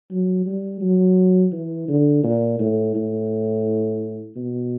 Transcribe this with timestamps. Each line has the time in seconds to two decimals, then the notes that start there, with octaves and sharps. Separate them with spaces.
0.11 F#3
0.46 G3
0.81 F#3
1.52 E3
1.89 D3
2.24 A#2
2.59 A2
2.95 A2
4.36 B2